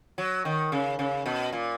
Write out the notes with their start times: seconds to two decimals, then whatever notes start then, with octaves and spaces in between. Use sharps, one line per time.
0.18 F#3
0.45 D#3
0.72 C#3
0.99 C#3
1.26 B2
1.53 A#2